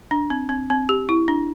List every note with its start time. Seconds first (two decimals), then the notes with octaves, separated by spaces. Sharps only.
0.11 D4
0.30 C4
0.49 C4
0.70 C4
0.89 G4
1.09 E4
1.28 D4